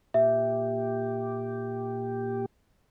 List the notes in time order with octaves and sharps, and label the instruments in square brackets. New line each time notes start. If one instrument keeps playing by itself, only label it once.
[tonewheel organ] A#2 G4 [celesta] E5